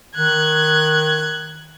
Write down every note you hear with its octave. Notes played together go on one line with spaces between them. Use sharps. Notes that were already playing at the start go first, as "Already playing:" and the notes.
D#3 F#6 G#6